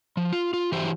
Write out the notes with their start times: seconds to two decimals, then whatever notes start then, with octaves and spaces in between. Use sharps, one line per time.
0.17 F3
0.33 F4
0.53 F4
0.72 E3 F#3 E4 G4 C5